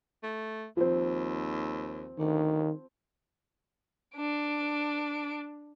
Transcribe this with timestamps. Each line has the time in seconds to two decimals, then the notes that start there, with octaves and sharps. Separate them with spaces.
0.23 A3
0.77 D#2 F3 C4
2.18 D2 D#3
4.16 D4 D7